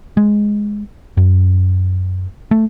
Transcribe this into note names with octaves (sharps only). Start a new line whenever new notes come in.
G#3
F#2
A3